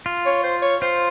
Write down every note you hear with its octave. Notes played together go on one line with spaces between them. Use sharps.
F4
C#5
C5
C#5
F4 C5